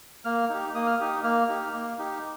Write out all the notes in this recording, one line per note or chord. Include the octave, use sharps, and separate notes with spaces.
A#3 F6
D#4 G4
A#3 D#6
F6
D#4 G4 D#6
A#3 F6
D#4 G4
A#3
D#4 G4